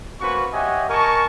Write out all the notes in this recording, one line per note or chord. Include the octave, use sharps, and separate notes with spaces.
A#3 C#4 F#4 B4 C5 C#6
G4 C#5 D#5 E5 F#5 G#5
A#4 D#5 G#5 A5 C#6